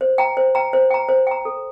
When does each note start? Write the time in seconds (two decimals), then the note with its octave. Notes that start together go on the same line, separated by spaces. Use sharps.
0.01 C5
0.18 G5 A#5
0.37 C5
0.55 G5 A#5
0.73 C5
0.90 G5 A#5
1.09 C5
1.27 G5 A#5
1.45 A4